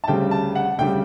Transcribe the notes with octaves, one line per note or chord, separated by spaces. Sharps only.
A5
D2 C#3 G3 G5
A5
F#5
D2 C#3 G3 G5